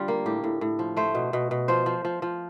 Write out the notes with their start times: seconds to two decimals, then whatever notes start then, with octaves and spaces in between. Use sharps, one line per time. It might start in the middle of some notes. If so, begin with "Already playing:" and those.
Already playing: D3 G3 F4
0.08 A#3
0.26 A2 G4
0.44 A2
0.61 A2
0.79 F3
0.97 A3 C5
1.15 B2
1.33 B2
1.51 B2
1.68 F3 C5
1.86 F3
2.05 F3
2.22 F3